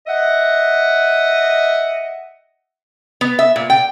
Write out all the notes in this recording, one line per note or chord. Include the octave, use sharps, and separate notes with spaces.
D#5 E5 F#5
B3
E5
A#2
G5